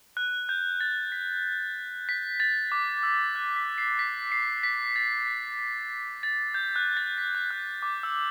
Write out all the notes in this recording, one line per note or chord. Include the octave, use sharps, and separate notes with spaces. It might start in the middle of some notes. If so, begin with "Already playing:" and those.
F#6
G6
A6
B6
B6
A6
D6
E6
F#6
B6
C7
B6
C7
B6
A6
B6
C7
A6
G6
F#6
A6
B6
G6
F#6
D6
E6